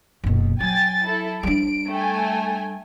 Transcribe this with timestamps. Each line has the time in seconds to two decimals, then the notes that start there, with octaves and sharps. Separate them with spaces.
0.24 F#1 B2
0.60 F#3 G5 G#5 A6
1.05 E4 A4
1.43 G3 D4 D7
1.90 A3 G5 G#5